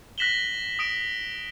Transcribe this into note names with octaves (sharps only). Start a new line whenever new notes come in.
F#6 A#6 B6 E7 F#7 G7
D#6 D7 E7